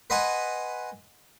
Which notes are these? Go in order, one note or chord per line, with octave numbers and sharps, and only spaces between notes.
B4 C5 D#5 F#5 G#5